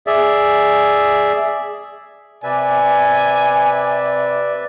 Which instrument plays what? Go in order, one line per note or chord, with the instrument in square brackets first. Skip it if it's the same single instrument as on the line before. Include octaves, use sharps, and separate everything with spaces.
[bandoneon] G#4 D5 E5
[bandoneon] C3 B4 E5 [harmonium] D5 [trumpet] G#5